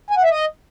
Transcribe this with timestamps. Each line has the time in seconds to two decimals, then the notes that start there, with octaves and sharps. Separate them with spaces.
0.10 G#5
0.17 F#5
0.24 E5
0.30 D#5